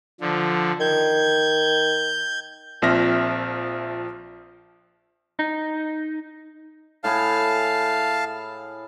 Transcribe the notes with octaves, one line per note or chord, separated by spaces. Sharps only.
D3 F3
D#3 G6 G#6
A#1 F3 C4 E5 F6 A#6
D#4
A2 E4 G#4 F5 A5 F6